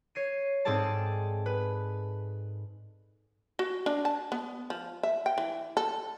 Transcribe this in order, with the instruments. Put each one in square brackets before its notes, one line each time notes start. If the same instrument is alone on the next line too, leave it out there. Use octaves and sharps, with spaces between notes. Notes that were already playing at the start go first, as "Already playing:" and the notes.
[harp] C#5 C7 D#7
G#2 C4 G#4 A4 D5 A5
B4
[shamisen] F#4
D4
A5
B3
F3
E5
G5
E3
A4